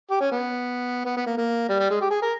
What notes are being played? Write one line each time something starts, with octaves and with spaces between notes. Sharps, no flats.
G4
C#4
B3
B3
B3
A#3
A#3
G3
G3
G#3
G4
G#4
A#4